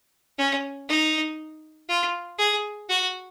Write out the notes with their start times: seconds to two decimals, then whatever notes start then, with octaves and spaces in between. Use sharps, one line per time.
0.38 C#4
0.89 D#4
1.89 F4
2.39 G#4
2.89 F#4